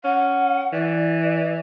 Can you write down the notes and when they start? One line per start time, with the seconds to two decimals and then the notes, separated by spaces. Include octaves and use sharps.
0.04 C#4 F#5
0.73 E3 D5